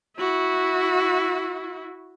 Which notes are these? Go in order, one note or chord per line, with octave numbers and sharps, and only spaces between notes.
E4 F#4